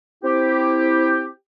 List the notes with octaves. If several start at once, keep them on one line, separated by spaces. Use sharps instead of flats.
C4 E4 G4